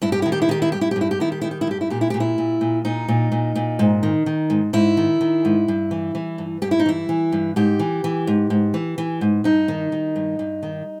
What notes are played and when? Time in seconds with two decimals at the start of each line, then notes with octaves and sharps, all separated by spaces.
0.02 G2 E4
0.12 G4
0.22 D#3 E4
0.32 G4
0.42 E4
0.49 D#3 G4
0.62 E4
0.72 G2 G4
0.81 E4
0.91 G4
0.96 G2
1.01 E4
1.11 G4
1.20 D#3 E4
1.32 G4
1.41 D#3 E4
1.51 G4
1.61 E4
1.67 G2 G4
1.81 E4
1.90 A#2 G4
2.01 E4
2.10 A#2 G4
2.20 E4
2.38 A#2
2.61 A#2
2.85 A#2 D#4
3.08 A#2
3.32 A#2
3.55 A#2
3.79 G#2
4.03 D#3
4.26 D#3
4.50 G#2
4.73 G#2 E4
4.97 D#3
5.21 D#3
5.45 G#2
5.68 G2
5.91 E3
6.15 E3
6.38 G2
6.62 G2 G4
6.71 E4
6.79 D#4
6.86 E3 E4
7.09 E3
7.32 G2
7.56 G#2 G4
7.79 E3
8.04 E3
8.27 G#2
8.50 G#2
8.74 E3
8.98 E3
9.21 G#2
9.44 G2 D#4
9.68 D#3
9.92 D#3
10.16 G2
10.39 G2
10.63 D#3